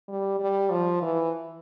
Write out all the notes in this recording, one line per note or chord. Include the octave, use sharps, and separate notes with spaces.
G3
G3
F3
E3